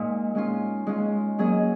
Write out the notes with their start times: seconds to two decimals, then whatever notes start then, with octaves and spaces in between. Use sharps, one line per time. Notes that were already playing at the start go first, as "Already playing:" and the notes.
Already playing: A#2 G#3 D#4
0.35 G#3 C#4 F4
0.87 G#3 C#4 F4
1.38 F#3 A#3 C#4 G#4 D#5